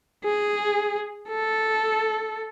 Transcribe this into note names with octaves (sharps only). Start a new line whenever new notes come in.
G#4
A4